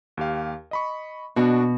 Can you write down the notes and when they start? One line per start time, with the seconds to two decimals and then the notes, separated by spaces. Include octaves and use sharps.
0.17 D#2 G4 F5
0.71 D#5 B5 C#6
1.36 B2 D4 F#4 D#5